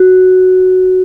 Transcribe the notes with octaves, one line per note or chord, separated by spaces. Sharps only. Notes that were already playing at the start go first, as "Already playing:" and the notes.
Already playing: F#4